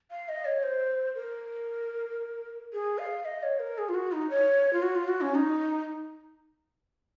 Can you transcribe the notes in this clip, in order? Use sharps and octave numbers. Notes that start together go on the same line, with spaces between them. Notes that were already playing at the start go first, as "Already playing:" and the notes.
F5
D#5
C#5
C5
A#4
G#4
F5
D#5
C#5
A#4
G#4
F4
F#4
D#4
C#5
F4
F#4
F4
F#4
C#4
D#4